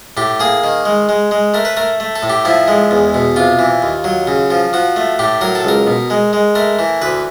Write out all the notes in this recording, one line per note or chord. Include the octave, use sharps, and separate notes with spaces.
A2 G4
A#3 G#4
D#3
G#3
G#3
G#3
A3 A#4
B4
A3 A#4
A3
A4
A2
G4
F3 E4
G#3
E2
B2
C3 F4
E3
D#2
F#3
C#3
F3
F3 F#4
A3
A2 G4
F#3 A#4
A4
C#2 A#4
B2
G#3
G#3
A3 A#4
E3
D2 B4